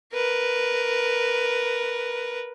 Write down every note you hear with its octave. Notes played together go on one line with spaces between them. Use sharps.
A#4 B4